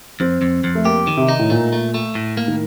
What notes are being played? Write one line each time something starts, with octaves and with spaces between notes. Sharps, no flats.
F2 C4
F2
F2
A3
A#3 G4
D#3
C3
D#4
A2
A#2 A3
A3
A3
A2
A#3
D#3